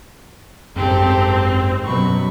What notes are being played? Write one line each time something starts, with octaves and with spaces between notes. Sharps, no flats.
G#1 F#2 C4 G4 A4
F#2 B2 B5 C#6